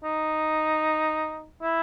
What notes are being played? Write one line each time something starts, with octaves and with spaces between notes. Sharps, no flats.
D#4
E4